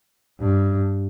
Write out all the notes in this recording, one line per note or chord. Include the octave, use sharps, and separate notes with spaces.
G2